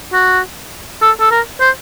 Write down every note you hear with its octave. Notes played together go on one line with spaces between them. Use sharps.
F#4
A4
A4
A#4
C5